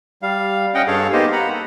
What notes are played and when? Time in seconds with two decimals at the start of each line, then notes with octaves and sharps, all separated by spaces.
0.22 G3 F5
0.74 C#4 D#5 F#5 G5
0.87 G2 G#4 A4 C#5 F5
1.13 A#3 B3 D#4 G4 C5 D#5
1.33 F#5 A#5 B5
1.53 A4